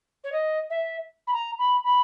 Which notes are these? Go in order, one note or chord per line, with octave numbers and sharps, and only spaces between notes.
C#5
D#5
E5
B5
A#5
B5
B5